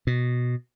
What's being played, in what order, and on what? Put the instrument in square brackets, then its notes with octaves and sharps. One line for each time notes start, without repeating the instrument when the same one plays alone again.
[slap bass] B2